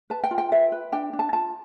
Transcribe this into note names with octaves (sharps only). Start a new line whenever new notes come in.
B4 A5
G5
F4
G5
B4 E5
B4
D4 G5
D4
A5
F4 A5